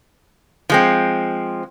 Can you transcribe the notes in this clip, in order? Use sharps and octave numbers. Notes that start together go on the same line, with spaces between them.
F3 G#3 C4